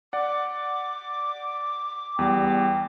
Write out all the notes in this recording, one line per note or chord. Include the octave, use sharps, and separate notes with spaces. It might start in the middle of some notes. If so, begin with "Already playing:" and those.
D5 F#5 D6
E2 G3 G5